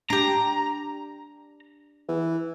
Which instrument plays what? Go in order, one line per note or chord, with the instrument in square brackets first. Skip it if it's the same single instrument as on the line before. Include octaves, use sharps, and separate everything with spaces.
[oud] D4 G4 [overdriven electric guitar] A#5
[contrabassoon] E3